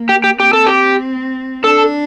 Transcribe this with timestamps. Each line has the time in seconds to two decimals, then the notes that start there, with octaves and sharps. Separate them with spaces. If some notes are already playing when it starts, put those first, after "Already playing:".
Already playing: A#3
0.09 G4
0.24 G4
0.39 C4 G4
0.53 A4
0.67 G4
1.64 D4 A4